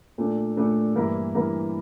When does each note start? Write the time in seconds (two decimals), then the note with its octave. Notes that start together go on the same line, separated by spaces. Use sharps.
0.18 A#2 A3 D4 A4
0.57 A#2 A3 D4 A4
0.96 G2 E3 A#3 E4 A#4
1.35 G2 E3 A#3 E4 A#4